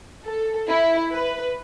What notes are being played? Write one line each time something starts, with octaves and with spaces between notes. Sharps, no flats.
A4
E4
B4